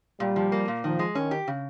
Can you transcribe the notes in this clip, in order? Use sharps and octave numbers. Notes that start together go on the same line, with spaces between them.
A#2 G3
F3
A#3
A#2
D#3 F3
G#3
D#3 C#4
G4
C#3